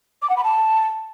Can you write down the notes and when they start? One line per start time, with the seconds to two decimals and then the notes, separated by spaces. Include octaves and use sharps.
0.22 D6
0.30 F#5
0.37 B5
0.44 A5